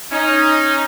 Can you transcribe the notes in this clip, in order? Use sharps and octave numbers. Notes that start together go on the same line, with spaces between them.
C#4 D#4